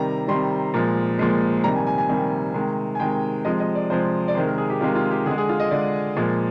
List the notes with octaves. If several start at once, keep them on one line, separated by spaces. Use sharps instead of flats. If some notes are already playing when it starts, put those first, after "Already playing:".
Already playing: C3 D#3 G3 A#5
C3 D#3 G3 C6
A#2 F3 G#3
A#2 F3 G#3
C3 D#3 G3 A#5
G#5
G#5
G#5
C3 D#3 G3
C3 D#3 G#3
G#5
C3 D#3 G#3 G5
C3 F3 G#3 D#5
D#5
D5
C3 F3 G#3 C5
D5
C3 D#3 G#3 C5
A#4
G#4
G4
C3 D#3 G#3 F4
F4
G4
D3 G#4
G#3
G#4
F4
D#5
D3 G#3 D5
A#2 F3 G#3